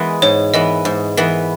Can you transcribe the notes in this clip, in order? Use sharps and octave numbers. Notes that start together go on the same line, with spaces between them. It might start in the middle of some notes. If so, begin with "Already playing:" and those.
Already playing: E3 G#3 B3
G#2 C#5
E3 B3 D#5
G#2
E3 B3